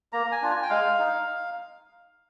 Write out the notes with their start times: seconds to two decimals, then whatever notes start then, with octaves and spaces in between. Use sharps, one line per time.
0.13 A#3 A#5
0.32 G#5
0.42 D4 F4
0.51 G#5
0.63 G5
0.70 G#3 F5
0.99 D#4